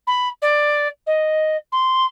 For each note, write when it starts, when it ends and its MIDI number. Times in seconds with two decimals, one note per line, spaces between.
0.07 0.28 83
0.42 0.87 74
1.06 1.56 75
1.72 2.06 84